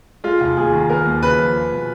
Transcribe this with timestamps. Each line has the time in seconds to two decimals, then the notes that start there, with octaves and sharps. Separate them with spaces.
0.24 G#3 F4
0.41 F1
0.57 D#2 G#4
0.73 D#3
0.89 B3 A#4
1.05 D#2
1.22 C#3 B4
1.38 F3
1.55 G#4
1.72 B2